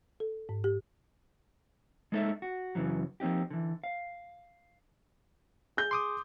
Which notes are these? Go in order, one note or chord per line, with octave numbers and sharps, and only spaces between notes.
A4
G#2
G4
G#3 A#3 D#4 A4 C5 E5
F#4
F#2 A2 C#3 E3 F#3
F3 A#3 C4 D#4 G4
D3 E3
F5
G#4 G6
C6 D6 D#6